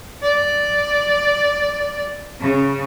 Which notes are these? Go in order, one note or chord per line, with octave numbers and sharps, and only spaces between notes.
D5
C#3